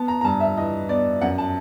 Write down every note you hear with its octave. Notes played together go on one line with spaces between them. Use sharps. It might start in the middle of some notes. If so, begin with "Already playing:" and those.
Already playing: B3 A5
A#5
A#5
G2 A5
E5
E3 D#5
B3 D5
F#2 F#5
A5